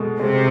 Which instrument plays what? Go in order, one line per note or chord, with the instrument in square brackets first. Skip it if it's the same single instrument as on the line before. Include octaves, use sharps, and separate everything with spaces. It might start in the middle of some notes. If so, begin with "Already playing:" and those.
Already playing: [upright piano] B2 G#3 A3
[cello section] C3 [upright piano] G#3